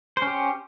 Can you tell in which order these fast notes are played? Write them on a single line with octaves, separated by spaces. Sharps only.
C5 C#4 G4